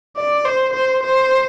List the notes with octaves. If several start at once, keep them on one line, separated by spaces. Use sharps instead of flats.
D5
C5
C5
C5